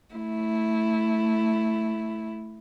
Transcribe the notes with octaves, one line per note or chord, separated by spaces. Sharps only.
A3 E4